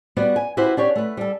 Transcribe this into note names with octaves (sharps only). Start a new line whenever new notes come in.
G3 B3 F#4 D5
G#5
E4 F#4 G4 B4 C5
D4 G4 C#5
A3 B4
G3 A4